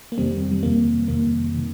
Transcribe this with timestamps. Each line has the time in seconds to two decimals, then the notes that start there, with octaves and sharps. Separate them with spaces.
0.12 A#3
0.18 F2 C3 D#3 G3 C4
0.51 G3
0.63 F2 C3 D#3 A#3
1.08 F2 C3 D#3 A#3
1.55 C3 D#3